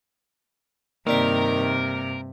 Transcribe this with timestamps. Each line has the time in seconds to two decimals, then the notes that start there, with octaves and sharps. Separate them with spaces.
1.07 G2 C3 D#3 A#3 A#4 D5 B6